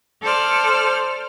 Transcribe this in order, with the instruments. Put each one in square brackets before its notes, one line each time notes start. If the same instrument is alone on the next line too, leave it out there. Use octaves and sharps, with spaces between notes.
[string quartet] A4 C5 D5 F6